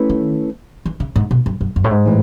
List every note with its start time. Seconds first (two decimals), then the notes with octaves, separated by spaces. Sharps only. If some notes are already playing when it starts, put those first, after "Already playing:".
Already playing: A3 C#4 E4 B4
0.10 D#3
0.86 E3
1.00 C#3
1.16 G#2
1.31 B2
1.46 F#2
1.61 F#2
1.76 F#2
1.84 A2
1.91 G#2
2.06 A2 E3